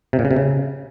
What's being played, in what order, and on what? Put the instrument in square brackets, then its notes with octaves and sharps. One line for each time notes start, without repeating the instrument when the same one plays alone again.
[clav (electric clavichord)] C3
A#2
C#3
C3
C#3